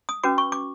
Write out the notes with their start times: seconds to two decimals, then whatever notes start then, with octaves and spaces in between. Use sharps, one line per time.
0.09 D#6
0.24 C#4 F#4 B4 D6
0.38 C#6
0.52 D6